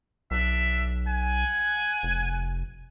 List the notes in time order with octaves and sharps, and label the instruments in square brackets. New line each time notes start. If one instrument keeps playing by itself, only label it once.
[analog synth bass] B1 [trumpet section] D4 E5
[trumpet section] F#5 G#5
[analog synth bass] F1